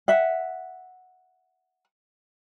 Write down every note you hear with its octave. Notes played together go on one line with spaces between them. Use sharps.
E5 F#5